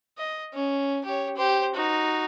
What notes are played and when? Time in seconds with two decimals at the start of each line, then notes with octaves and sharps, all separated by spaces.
0.18 D#5
0.53 C#4
1.05 G4 C#5
1.36 G4 C5
1.74 D#4 F#4